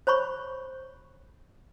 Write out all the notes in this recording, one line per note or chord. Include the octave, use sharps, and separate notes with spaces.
C5 C#5 B5 C#6